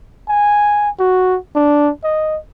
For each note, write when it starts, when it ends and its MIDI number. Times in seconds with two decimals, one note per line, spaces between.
0.29 0.90 80
1.00 1.37 66
1.55 1.90 62
2.04 2.38 75